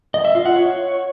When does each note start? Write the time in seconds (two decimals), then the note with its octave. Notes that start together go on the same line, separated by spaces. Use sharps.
0.14 D#5
0.25 E5
0.35 F4
0.46 F#5
0.56 C#5